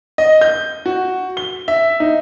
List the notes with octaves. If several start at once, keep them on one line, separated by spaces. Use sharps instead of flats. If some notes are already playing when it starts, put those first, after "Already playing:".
D#5
G6
F#4
G7
E5
D#4